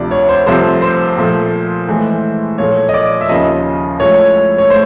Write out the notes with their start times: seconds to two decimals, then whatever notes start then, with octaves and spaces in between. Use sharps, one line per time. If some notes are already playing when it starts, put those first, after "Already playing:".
Already playing: D2 C3 F3 D5
0.11 C#5
0.29 C5
0.46 C2 C3 F3 A3 C5
0.82 C5
1.17 A#2 F3 A3
1.88 A2 E3 G#3
2.58 A#2 F3 A3 C#5
2.89 D#5
2.94 D5
3.21 E5
3.29 D#2 C#3 F3 D#5
4.00 A2 F3 G#3 C#5
4.58 C#5
4.70 A2 C5